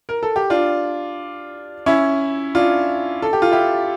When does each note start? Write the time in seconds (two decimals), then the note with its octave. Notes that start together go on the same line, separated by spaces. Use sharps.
0.09 A#4
0.23 A4
0.36 G4
0.50 D4 F4
1.86 C#4 E4
2.55 D4 F4
3.22 A4
3.33 G4
3.42 F4
3.51 E4 G4